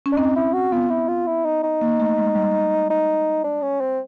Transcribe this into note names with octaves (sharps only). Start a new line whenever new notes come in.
C#4
D4
C4 D#4
E4
F#4
B3 F4
E4
F4
E4
D#4
D#4
A#3
A3
G#3
G3
D#4
D4
C#4
C4